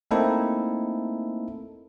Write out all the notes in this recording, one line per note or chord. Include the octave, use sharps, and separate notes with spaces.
A3 A#3 C4 D#4 E4 A4